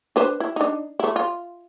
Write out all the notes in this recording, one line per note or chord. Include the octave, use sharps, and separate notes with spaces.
D4 B4 C5
E4
D4 D#4
A3 E4
F4